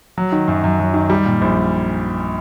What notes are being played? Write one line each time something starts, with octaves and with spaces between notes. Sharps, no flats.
F#3
D#3
F#2
F#2
F#3
D#3
G3
A#2
A#1